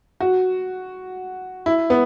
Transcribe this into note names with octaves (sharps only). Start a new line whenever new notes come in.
F#4
E4
B3